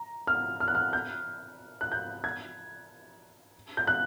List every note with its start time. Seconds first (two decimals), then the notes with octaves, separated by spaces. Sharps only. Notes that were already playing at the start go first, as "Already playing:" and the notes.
Already playing: A#5
0.27 F6
0.60 F6
0.68 F#6
0.75 F6
0.93 G6
1.81 F#6
1.92 G6
2.24 G#6
3.77 G6
3.87 F#6